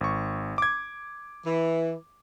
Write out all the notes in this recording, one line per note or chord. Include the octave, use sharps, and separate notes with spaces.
G#1 C#6
D6 G#6
E3